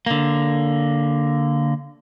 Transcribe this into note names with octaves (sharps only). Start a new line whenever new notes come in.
D3 A#3